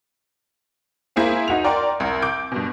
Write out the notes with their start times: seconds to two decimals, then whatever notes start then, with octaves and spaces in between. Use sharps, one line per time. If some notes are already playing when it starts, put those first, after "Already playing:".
1.16 A#3 E4 G#4 C5 F5
1.48 D#4 F#4 F7
1.64 A#4 D5 G5 C6
2.00 C2 A#4
2.22 D6 G6 D7
2.52 G2 B2